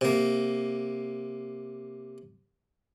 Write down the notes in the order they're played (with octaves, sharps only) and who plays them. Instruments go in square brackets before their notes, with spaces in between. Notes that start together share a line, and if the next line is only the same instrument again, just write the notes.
[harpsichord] C3 A#3